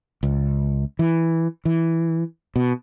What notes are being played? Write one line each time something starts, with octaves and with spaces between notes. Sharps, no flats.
C#2
E3
E3
B2